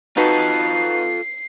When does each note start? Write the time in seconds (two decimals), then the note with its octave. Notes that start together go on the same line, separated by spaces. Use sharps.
0.17 D#4 F4 F#4 A4 B4 C7